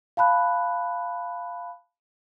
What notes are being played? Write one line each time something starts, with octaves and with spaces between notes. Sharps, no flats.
F5 A5 B5 F#6